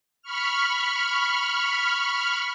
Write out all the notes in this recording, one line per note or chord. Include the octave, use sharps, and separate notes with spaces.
B5 C#6 F6